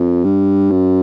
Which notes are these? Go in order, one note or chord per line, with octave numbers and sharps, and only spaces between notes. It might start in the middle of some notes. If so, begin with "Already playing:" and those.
Already playing: F2
G2
F#2